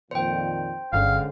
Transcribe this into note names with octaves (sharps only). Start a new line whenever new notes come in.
F2 A#2 D#3 C5 G5
G1 D3 G#3 C#4 F5